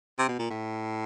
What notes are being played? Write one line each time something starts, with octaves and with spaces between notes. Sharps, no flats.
C3
B2
A#2
A2